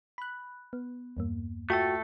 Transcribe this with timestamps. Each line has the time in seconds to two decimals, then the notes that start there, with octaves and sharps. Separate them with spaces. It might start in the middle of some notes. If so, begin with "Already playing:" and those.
0.18 B5 F#6
0.73 B3
1.17 E2 G2 A#3
1.70 A3 F4 F#4 A4 E5 G5